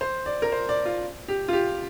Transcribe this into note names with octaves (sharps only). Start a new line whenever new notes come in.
C5
D5
A#4
C5
D5
F4
G4
F4
G4